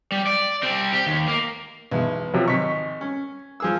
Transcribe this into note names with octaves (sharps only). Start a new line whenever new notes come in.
G3
D5
G3 C4
G4
D#2
A#3
B1 E2
C3 F3 F#3
G#1 C#6 B6
C#4
F3 G#4 E6